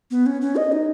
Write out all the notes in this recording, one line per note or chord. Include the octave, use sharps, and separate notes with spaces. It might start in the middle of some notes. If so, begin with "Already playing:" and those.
B3
C#4
C#4
D#5
D#4